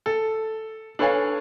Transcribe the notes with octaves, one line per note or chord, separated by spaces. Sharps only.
A4
D4 A4 B4 C#5 F5 G#5